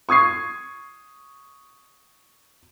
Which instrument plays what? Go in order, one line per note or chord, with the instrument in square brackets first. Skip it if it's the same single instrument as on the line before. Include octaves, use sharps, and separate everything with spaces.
[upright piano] C#6 D#6 G#6 C7